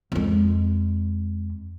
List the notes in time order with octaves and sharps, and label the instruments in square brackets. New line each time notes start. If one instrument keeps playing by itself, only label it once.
[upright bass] F2 G#3